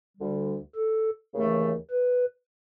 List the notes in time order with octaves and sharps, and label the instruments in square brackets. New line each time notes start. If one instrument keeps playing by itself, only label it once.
[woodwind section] D2 D3 G3
[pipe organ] A4
[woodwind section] D#2 C#3 E3 A3
[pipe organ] B4